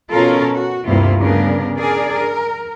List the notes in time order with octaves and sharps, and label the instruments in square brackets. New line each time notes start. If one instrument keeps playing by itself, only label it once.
[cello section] B2 C#4 F4 A4 A#4
F#4
D2 G2 C3 A#3 E4 F4
G2 C#3 B3 D4 A#4
D4 G#4 A#4 D5
A#4